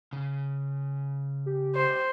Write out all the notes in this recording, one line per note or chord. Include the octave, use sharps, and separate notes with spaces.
C#3
G4
C5